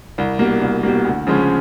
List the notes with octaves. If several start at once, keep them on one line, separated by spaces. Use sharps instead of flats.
C2
B2 G3 A#3
C2
B2 G3 A#3
D2
C#3 F3 G#3 C#4